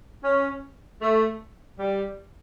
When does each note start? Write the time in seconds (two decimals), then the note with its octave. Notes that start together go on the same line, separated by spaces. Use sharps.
0.24 C#4
1.01 A3
1.79 G3